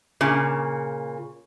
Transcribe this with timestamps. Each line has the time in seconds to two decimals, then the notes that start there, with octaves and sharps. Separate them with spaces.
0.21 A#2 C#3